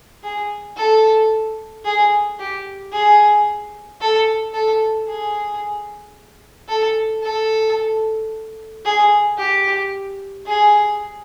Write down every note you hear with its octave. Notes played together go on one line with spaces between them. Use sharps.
G#4
A4
G#4
G4
G#4
A4
A4
G#4
A4
A4
G#4
G4
G#4